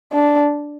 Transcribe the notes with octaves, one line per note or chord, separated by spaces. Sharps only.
D4